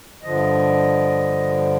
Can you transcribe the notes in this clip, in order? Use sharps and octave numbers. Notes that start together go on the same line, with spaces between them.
G2 D3 F3 D#5